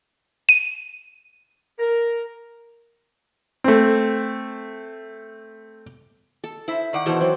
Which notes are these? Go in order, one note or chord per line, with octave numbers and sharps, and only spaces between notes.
D#7
A#4
A3 C4
A4
E4 C5
D#3 D5 F#5
B2 E3 A4 C5
F#3 C4